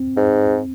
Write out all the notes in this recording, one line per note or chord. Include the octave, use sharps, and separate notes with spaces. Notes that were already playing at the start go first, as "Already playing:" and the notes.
Already playing: C4
G#2